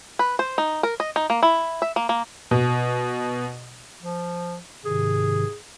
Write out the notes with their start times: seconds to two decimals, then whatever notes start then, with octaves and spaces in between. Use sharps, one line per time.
0.19 B4
0.39 C5
0.58 D#4
0.83 A#4
1.00 D#5
1.16 D#4
1.30 A#3
1.43 E4
1.82 E5
1.96 A#3
2.09 A#3
2.51 B2
4.02 F3
4.85 G#2 C3 D#3 G#4